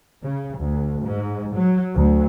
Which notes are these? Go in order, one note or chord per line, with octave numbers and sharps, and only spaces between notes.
C#3
D2
G#2
F#3
D2